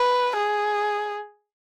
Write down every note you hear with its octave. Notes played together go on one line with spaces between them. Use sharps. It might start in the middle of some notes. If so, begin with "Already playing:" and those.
Already playing: B4
G#4